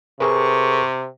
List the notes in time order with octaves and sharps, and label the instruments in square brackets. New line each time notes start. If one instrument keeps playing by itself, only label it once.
[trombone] C3 [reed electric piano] G#4 A#4 B4 [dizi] C#6